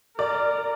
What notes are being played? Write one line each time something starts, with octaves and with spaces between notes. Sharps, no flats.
A#4 D5